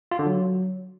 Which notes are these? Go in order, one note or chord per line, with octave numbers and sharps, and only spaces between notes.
F4
D3
F#3